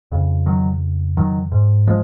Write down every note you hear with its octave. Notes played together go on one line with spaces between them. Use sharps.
F2 C#3
D#3 F#3
D#3 F#3
G#2
F3 G#3